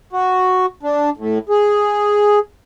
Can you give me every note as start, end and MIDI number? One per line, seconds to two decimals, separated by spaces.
0.13 0.66 66
0.83 1.10 62
1.17 1.39 45
1.49 2.39 68